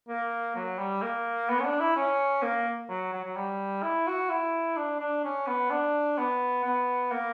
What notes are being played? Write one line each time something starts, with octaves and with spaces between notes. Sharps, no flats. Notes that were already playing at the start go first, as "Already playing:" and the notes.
A#3
F#3
G3
A#3
B3
C#4
D4
E4
C#4
A#3
F#3
F#3
F#3
G3
E4
F#4
E4
D4
D4
C#4
B3
D4
B3
B3
A#3